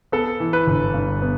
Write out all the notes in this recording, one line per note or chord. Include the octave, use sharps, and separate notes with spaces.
B3 A4
E3
B4
G1
G2
B3